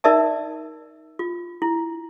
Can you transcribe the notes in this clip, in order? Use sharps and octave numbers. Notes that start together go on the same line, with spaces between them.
D#4 A#4 D5 E5 A5
F4
E4